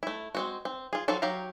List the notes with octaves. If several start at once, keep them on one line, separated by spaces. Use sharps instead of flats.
A3 E4
G#3 C4 F#4
C4
F4 G#4
F3 F#3 F4 F#4 A4
F#3 G4 F5 A#5